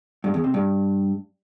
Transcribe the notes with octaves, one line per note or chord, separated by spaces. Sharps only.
G2
E2
C3
G2